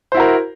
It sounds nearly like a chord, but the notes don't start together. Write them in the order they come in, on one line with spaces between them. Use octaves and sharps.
C5 E4 F#4 A#4